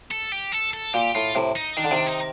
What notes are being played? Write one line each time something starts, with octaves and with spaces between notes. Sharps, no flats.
A4
G4
A4
A4
A#2 G4
A2 F4
A2 C3
D#4
D#3 D4
D3
C3 D#3
D#4